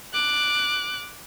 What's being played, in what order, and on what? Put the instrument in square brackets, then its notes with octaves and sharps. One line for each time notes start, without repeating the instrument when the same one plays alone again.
[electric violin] D6 F#6